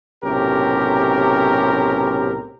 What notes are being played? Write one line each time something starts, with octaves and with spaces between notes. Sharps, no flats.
B1 A2 C3 C#4 G4 A#4